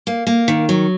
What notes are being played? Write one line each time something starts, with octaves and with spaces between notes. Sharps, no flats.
A#3
A#3
D#3
F#3